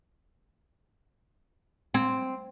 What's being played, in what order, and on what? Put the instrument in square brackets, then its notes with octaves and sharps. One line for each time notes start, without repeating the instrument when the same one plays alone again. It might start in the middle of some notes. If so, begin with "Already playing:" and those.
[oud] C4